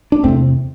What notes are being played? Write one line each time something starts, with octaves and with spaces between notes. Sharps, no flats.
D4
E2 C3 A3 C4